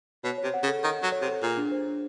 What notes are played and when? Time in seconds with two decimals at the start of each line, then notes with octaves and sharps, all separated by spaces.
0.24 B2 C#5
0.38 C#5
0.43 C3
0.54 F#5
0.63 C#3
0.68 A4
0.83 D#3 C#5
0.98 F#3 F#5
1.12 C#5
1.22 C3
1.28 A4
1.42 A#2 G#4
1.57 D4
1.72 C5
1.87 D4